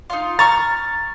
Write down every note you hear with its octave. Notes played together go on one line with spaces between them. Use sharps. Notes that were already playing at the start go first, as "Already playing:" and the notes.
D#4 F4
A#5 C#6 F6 A6